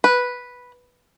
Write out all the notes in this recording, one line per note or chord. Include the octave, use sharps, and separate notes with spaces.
B4